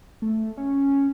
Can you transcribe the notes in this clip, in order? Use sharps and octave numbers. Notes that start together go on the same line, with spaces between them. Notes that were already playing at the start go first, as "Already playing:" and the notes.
A3
C#4